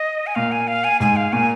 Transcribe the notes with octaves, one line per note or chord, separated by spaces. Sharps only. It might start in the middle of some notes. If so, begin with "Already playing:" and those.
Already playing: D#5
G#5
A#2 F5
G#5
F5
G#5
G#2 G#5
F5
A#2 G#5